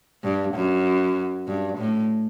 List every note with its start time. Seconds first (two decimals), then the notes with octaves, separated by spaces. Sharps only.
0.23 G2
0.54 F#2
1.48 G2
1.78 A2